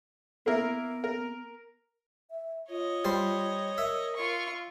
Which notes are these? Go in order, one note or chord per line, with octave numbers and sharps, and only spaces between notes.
A#3 B3 E4 A#4
A#4
E5
F4 C#5 D#5
G3 C5
A#4 E5
F4 C#6